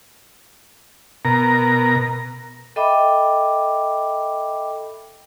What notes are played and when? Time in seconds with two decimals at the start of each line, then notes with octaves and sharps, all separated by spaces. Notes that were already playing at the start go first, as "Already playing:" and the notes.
1.25 B2 A#4 A#5
2.76 A4 D#5 E5 G5 B5 D6